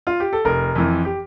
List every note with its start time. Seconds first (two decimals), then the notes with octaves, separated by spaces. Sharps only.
0.07 F4
0.20 G4
0.33 A4
0.45 F1 A#4
0.75 F2 E3
1.05 G4